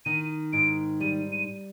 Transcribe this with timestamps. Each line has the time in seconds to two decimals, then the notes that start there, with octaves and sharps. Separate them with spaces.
0.05 D#3 D#7
0.53 G#2 D7
1.00 G3 D#7
1.32 D#7